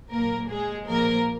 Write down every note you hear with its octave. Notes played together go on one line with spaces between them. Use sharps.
A#2 F#3 A#3 A#4
G#3 G#4
A#2 F3 A#3 A#4